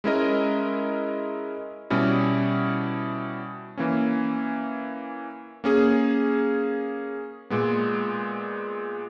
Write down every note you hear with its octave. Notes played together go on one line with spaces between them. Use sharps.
G#3 C#4 E4 A#4 D#5
B2 G3 C#4 E4
E3 A#3 C#4
A#3 C#4 G#4
A#2 G#3 B3